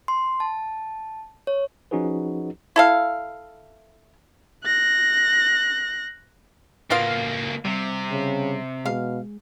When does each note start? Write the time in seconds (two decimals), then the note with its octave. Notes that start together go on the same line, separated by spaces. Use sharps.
0.08 C6
0.40 A5
1.47 C#5
1.91 F3 C#4 D#4 F#4 G#4 B4
2.76 E4 A4 F5
4.65 F#6 A#6
6.90 C#2 A2 A#3 B3 F4 F5
7.65 C3 G3
8.11 C#3
8.85 B2 G#3 F5